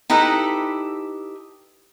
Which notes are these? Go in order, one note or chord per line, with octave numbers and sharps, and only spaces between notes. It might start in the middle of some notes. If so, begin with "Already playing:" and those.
D#4 E4 G4 A4 B4